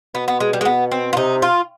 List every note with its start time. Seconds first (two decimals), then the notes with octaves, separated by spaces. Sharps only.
0.14 B2 B3
0.28 B3
0.40 G#3
0.53 G3
0.61 G#3
0.65 B3
0.91 C4
1.13 F4
1.17 C3 D#4
1.42 F4